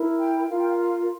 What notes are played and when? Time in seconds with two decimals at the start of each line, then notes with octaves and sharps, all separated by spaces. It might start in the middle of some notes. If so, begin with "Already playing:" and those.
Already playing: E4 A#4
0.17 G5
0.49 F4 A#4 F5
0.58 G5
0.67 F5
0.79 F5